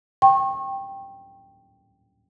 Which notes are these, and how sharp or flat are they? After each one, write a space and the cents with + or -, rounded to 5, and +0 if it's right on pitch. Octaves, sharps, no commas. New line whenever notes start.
G5 +0 C#6 -35